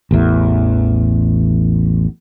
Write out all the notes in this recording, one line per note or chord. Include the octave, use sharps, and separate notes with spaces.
A1 E2